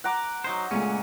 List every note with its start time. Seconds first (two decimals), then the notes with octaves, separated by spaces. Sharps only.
0.04 F#5 A#5 D6
0.44 F#3 D#4 C5
0.71 C#2 A#2 G#3 A3 C#4